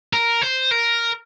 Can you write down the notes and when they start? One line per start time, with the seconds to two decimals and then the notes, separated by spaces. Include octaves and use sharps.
0.13 A#4
0.42 C5
0.71 A#4